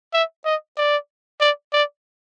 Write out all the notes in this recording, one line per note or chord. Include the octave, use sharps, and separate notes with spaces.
E5
D#5
D5
D5
D5